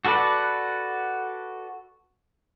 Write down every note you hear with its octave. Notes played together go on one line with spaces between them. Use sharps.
F#4 A4 B4 D5